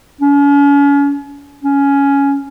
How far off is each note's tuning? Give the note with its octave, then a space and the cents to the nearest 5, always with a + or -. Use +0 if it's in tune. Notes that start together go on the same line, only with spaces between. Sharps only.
C#4 +40
C#4 +10